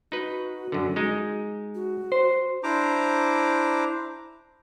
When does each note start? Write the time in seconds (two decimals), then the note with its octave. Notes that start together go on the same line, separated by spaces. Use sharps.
0.12 D#4 F#4 B4
0.72 F#2 D3
0.96 G#3 D#4
1.75 F#4
2.12 C5
2.63 D4 E4 C5 A#5 D6